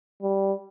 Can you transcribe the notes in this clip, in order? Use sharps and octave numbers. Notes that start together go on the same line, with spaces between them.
G3